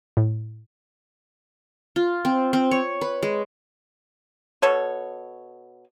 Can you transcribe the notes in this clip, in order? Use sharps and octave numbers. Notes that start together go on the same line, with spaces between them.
A2
F4
C4
C4
C#5
B4
G#3
B2 A4 C#5